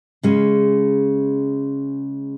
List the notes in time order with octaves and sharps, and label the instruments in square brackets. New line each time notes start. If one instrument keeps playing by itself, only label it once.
[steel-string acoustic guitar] C#3 G#3 C#4